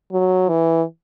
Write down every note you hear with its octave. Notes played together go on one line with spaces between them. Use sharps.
F#3
E3